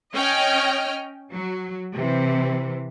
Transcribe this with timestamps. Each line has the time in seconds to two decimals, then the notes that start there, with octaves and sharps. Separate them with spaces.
0.15 C#4 D#5 G5 F6
1.31 F#3
1.95 C3 E3